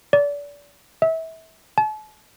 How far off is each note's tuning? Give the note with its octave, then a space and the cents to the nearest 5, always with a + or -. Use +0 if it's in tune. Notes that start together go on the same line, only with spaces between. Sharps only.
D5 -30
E5 -30
A5 -40